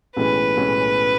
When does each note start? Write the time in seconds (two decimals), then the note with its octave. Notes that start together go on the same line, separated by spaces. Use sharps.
0.17 B1 A2 E3 G#3 C#4 B4
0.57 B1 A2 E3 G#3 C#4